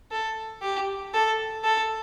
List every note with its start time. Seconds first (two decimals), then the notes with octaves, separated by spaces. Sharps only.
0.11 A4
0.62 G4
1.14 A4
1.64 A4